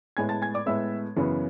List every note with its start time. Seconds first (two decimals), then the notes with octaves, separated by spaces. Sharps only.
0.17 A2 G#3 B3 G#5 G#6
0.29 A5 A6
0.42 G#5 G#6
0.54 D5 D6
0.66 A2 G#3 B3 E5 E6
1.16 F#2 C#3 E3 B3